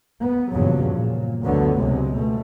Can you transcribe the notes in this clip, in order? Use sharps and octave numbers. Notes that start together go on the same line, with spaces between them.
B3
E2 G2 A#2 C#3 F3 F#3
A#2
F#1 D2 D3 F#3 A3 B3
C#2 C3 G#3
B2 A3